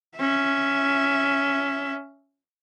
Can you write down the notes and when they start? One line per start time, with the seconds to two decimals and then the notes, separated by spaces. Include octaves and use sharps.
0.16 C#4 E5